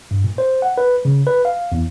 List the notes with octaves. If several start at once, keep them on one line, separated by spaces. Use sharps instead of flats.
G2
A#2
C5
F#5
B4
C#3
B4
F5
E2